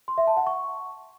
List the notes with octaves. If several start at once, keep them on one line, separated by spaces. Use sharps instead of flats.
C6
E5
A5
F#5
C#6